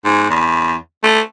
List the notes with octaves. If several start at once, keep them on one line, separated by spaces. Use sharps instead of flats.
G#2
E2
A3